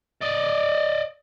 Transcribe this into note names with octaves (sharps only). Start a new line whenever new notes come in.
D5 D#5